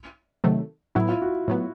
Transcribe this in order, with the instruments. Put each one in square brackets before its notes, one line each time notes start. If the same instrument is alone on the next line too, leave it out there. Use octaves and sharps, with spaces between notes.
[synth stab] C3 D#3 F#3 A3
[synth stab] A2 F#3 B3 [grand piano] E4
[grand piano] F4
F#4
[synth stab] A2 F#3 B3